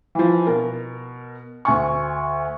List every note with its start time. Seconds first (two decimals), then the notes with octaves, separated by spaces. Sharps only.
0.15 E3 F3
0.47 B2 A#4
1.65 D2 G#5 C#6